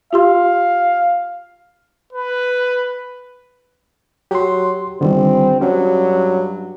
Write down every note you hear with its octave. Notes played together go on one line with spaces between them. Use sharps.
F4 G4 F5 C6
B4
F#3 G4 C6
G1 D3 D#3 G3 C4
G2 F#3 C#4